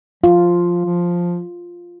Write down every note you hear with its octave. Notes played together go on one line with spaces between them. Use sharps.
F3 F4
F3